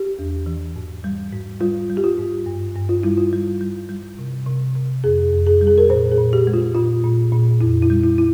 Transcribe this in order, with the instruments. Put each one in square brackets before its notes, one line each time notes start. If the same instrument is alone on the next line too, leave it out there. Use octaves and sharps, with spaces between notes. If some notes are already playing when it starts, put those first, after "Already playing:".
Already playing: [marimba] G4
E2
E3
G#2
G3
G#2
G3 F4
G3
G4
F4
G#2
G2
G2
F4
G3 E4
F4
G3
G3
G3
C3
C3
C3
F2 G#4
F2
G#4
G3
G#4
A#4
A#2 C5
G#4
A#2
G4
G#3
F4
A#2 F4
A#2
A#2
F2 E4
E4
G3
E4
E4